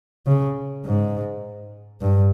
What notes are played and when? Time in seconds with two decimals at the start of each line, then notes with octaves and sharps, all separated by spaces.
0.27 C#3
0.85 G#2
2.02 G2